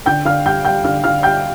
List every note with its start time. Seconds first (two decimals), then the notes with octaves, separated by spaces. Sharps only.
0.06 D3 G5 G6
0.25 D3 F5 F6
0.46 G3 G5 G6
0.65 G3 G5 G6
0.84 D3 F5 F6
1.04 D3 F5 F6
1.23 G3 G5 G6